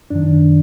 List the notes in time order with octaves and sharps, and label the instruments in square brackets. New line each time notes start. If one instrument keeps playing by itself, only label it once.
[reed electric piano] F#2 D#3 D4